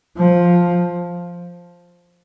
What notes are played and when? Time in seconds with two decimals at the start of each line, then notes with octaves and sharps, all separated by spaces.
0.17 F3